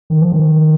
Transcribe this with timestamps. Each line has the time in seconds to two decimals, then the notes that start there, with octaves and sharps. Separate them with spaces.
0.10 D#3
0.21 F3
0.32 D#3